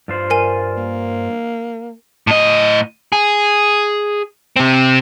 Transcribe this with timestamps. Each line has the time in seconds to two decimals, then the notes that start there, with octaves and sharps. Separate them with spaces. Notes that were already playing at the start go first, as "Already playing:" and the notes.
0.08 G2 F4 C5
0.30 A#4 G#5 D#7
0.77 A#3
2.27 A2 D#5
3.12 G#4
4.56 C3 C4